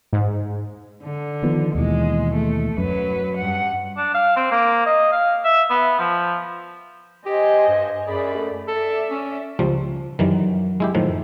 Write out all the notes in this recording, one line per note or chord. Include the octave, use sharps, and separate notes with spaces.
G#2
D3
D#3 F3 B3
D#2 B2 E3 G#3
A3
F#2 F#3 B4
G2 F#5
D4
F5
C4
A#3
D#5
F5
E5
B3
F3
G4 C5 D#5 G#5
G2
F#2 G#4 D5 B5
A3
A4 D5 E5
C#4
C#2 F3 G3
F#2 D#3 E3 G3
G#3 E4 G4
A2 D#3 F3